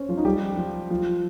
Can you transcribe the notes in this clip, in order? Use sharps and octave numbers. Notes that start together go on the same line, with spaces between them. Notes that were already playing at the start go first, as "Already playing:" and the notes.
Already playing: C#4 C5
F3 F4
D#4
G3 G4
F3 F4
F3 F4